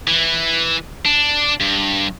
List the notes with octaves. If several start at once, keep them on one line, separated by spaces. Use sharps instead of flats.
E3
D4
G2